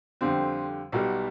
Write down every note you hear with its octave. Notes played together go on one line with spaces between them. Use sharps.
F2 D3 G3 C4
B1 B2 G3